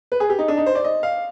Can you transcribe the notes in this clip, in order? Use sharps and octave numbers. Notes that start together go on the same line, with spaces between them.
B4
G#4
G4
D#4
D4
D#4
C5
D5
D#5
F5